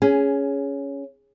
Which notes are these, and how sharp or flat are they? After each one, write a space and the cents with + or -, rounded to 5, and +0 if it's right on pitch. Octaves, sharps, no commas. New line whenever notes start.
C#4 +10 G#4 +0